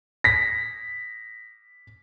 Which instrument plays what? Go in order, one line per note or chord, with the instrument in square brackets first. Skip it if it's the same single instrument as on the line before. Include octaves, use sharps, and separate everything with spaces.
[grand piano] A#6 B6